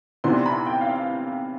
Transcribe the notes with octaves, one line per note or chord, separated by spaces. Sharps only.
C3 E3 B3 D4 C6
B5
G5
F5